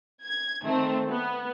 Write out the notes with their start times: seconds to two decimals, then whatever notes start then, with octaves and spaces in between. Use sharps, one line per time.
0.23 G#6
0.62 D#3 A3 C4
1.09 B3